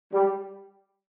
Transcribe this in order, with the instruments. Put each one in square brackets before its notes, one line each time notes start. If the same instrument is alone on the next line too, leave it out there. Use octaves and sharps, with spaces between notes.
[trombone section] G3